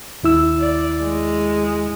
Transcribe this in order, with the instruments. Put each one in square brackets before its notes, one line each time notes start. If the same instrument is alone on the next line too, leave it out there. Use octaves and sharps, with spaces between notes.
[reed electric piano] D#2 E4 E6
[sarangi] D5
G#3